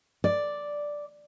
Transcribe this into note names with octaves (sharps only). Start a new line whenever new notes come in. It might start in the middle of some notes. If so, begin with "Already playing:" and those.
D5